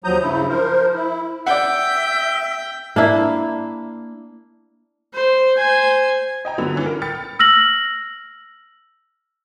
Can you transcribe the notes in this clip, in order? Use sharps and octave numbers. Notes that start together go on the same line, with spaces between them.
D#2 F3 F#3 A#5 D#6 G6
G2 C#3 E4
F3 A#4 C5
E4
D5 E5 F#5 G5
A#3 D4 E4
C5
C5 G#5
D#5 G5 A#5
D3 F#3 B3 B5 E6 F7
E3 C#4 E4
A#4
G5 B5 F6 A6 C#7
E6 F6 A#6 F#7